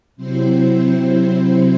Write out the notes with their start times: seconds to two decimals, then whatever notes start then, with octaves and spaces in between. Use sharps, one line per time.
0.16 C3 F#3 C4 E4 C5